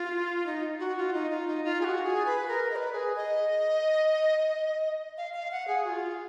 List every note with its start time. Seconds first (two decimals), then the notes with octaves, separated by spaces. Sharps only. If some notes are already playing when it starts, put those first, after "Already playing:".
Already playing: F4
0.46 D#4
0.79 F#4
0.97 F4
1.14 D#4
1.30 F4
1.47 D#4
1.64 F4
1.81 G#4
1.84 F#4
2.03 G#4
2.26 B4
2.48 A#4
2.71 D#5
2.76 B4
2.93 G#4
3.15 D#5
5.17 F5
5.34 F5
5.51 F#5
5.68 G#4
5.85 F#4
5.89 F4